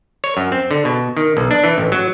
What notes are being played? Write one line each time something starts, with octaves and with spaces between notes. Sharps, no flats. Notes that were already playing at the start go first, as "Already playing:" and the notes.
C#5
F#2
C4
D3
B2
D#3
B1
D4
E3
A1
F#3